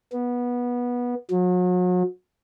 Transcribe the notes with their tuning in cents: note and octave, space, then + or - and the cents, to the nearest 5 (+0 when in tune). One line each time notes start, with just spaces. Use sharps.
B3 -20
F#3 -40